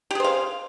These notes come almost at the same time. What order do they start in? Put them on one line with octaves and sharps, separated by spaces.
G4 G#4 C5 F5